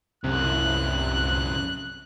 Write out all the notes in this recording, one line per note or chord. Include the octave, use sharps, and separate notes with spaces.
C2 F#2 C3 F#6